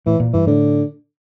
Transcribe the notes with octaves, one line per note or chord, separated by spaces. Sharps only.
A2 E3
A#2
G2 E3
A2 D3